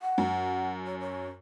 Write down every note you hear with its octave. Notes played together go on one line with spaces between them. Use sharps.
F#5
F#2
C#5
C#5